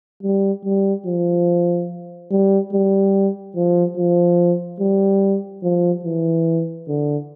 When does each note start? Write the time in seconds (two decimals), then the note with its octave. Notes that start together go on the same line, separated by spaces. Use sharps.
0.23 G3
0.65 G3
1.06 F3
2.31 G3
2.73 G3
3.56 F3
3.97 F3
4.80 G3
5.63 F3
6.05 E3
6.88 D3